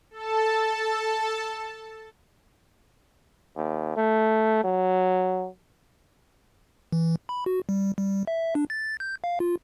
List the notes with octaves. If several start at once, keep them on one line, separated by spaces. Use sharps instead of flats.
A4 A5
D#2
A3
F#3
E3
B5
F#4
G3
G3
E5
D4
A6
G6
F5
F4